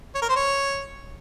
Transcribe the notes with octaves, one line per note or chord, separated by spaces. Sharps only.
C#5
A#4
C5
C#5